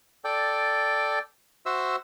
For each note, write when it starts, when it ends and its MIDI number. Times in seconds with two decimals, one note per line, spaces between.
0.25 1.19 69
0.25 1.19 74
0.25 1.19 79
1.66 1.96 66
1.66 1.96 72
1.66 1.96 76
1.66 1.96 88